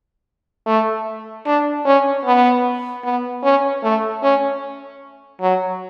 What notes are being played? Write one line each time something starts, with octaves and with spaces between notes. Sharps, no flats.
A3
D4
C#4
B3
B3
C#4
A3
C#4
F#3